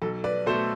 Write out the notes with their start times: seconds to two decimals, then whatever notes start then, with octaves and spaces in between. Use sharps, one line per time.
0.02 B1 A4
0.24 B4 D5
0.46 B2 A4 C5
0.49 A3